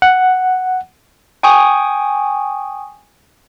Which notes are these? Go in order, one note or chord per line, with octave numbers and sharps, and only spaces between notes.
F#5
G5 G#5 C#6 D#6